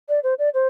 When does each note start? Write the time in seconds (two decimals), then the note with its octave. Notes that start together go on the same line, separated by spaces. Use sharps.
0.09 D5
0.23 C5
0.39 D5
0.54 C5